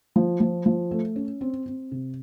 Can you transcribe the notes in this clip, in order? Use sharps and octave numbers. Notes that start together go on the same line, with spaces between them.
F3
F3
F3
A3
C#4
C4
C4
C3